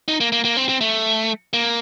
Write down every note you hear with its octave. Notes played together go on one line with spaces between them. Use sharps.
D#4
A#3
A#3
A#3
C4
C4
A3
A#3